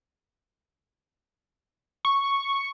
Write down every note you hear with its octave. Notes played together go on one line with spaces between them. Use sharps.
C#6